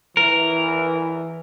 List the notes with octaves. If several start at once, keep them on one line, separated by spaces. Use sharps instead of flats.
E3 A#4